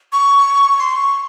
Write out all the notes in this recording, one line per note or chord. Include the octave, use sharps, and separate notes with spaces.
C#6
C#6
C6
C#6